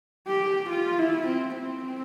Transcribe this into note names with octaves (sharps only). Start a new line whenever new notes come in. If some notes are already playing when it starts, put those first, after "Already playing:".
G4
F4
E4
C4
C4